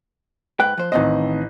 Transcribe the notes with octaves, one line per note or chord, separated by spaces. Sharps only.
G#2 B4 G5 F#6
F3 C5
A1 D#3 C4 C5 D#5